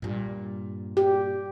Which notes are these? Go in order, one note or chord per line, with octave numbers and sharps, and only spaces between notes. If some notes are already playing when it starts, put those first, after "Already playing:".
G2 A#2
G4